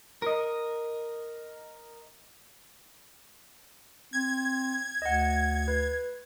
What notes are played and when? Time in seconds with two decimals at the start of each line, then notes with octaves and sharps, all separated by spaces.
0.22 A#4 D#5
4.13 C4 G#6
5.02 D2 D#5 F#5
5.68 B4